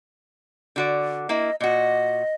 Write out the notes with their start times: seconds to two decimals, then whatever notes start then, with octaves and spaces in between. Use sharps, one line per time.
0.76 D3 F#4 D5
1.29 A#3 E4 D#5
1.60 A#2 F#4 D#5